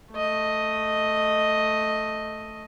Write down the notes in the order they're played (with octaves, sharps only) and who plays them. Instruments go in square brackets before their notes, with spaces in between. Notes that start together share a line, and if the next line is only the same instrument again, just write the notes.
[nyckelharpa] A3 D#5